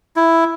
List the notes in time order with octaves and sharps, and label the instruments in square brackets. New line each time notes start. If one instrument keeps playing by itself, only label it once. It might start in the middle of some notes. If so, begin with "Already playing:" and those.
[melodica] E4